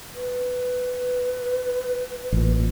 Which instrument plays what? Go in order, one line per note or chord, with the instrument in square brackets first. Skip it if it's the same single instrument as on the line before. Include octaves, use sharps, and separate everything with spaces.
[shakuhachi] B4
[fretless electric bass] A1 A#2